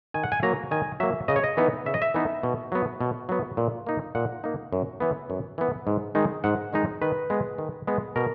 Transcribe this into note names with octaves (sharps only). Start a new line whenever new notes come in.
D#3 G#5
F#5
G#5
F#3 A#3 A#5
D#3 G#5
F#3 A#3 E5
C#3 D#5
C#5
D#5
E3 B3 D#4
C#3 E5
D#5
E5
E3 B3 D#4
B2
F#3 B3
B2
F#3 B3
A#2
A#3 D#4
A#2 F#5
A#3 D#4
F#2
E3 B3
F#2
E3 B3
G#2
D#3 G#3 D#4
G#2 F#5
D#3 G#3 D#4
D#3 B4
G#3 B3
D#3
G#3 B3
B2 A#4